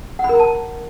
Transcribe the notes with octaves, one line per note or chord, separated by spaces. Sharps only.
F#5
B5
A#4
A#5
A5